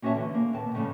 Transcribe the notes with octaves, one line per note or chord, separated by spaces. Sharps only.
A#3 C#4 F#4 C#5 E5 A5
D3 E3
A#3
D#2 B2 A5
G#2 C#3 F3 G3 A3